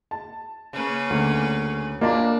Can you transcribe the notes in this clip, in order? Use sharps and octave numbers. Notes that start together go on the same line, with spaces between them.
A5
C#3 A#3 C#4 B4
D2
B2 A#3 D4 F4 D5 A#5